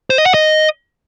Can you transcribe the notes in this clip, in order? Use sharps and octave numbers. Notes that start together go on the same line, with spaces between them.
C5
D#5
F#5
D#5